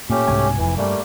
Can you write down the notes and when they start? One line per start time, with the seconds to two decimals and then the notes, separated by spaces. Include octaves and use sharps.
0.10 A#2 A3 C#4 G4
0.28 C2 G#2 B2 G#5
0.57 F1 F2 E3
0.77 G2 G3 A3 A#3